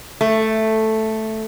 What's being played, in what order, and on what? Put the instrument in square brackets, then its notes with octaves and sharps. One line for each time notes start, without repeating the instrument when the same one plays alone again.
[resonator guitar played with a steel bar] A3